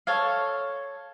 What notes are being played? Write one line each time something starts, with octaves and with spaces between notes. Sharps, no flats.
A4 C#5 F5